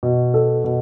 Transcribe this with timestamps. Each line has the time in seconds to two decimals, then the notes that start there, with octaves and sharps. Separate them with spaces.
0.03 B2
0.34 A4
0.64 B2